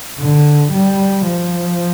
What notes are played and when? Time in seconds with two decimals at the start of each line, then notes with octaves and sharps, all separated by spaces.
0.19 D3
0.72 G3
1.25 F3